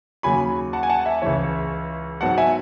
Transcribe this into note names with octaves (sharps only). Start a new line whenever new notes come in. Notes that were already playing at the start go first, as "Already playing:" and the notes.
D#2 C#3 F#3 G#5 B5
F#5 A5
G#5
F#5 A5
E5 G#5
C#2 C#3 E3 C#5 E5
G#2 F#3 B3 F#5 A5
E5 G#5